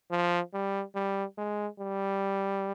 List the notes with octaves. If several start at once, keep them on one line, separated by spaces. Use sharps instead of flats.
F3
G3
G3
G#3
G3